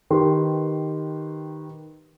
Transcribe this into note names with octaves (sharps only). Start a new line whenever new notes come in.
D#3 G4 B4 C6